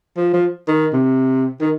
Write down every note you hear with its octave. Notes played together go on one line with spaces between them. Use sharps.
F3
F3
D#3
C3
D#3